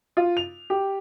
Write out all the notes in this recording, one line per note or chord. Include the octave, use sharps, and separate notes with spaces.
F4
F7
G4